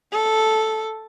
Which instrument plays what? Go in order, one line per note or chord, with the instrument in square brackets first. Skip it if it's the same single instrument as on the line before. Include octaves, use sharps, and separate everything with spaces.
[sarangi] A4